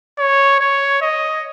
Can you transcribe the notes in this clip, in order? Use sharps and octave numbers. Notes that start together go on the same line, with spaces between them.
C#5
C#5
D#5